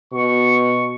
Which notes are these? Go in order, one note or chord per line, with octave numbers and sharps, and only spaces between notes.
B2 C#6